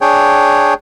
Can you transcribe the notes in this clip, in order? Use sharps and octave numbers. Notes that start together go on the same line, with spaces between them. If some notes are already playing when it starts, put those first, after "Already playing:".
D4 G#4 C#5 G5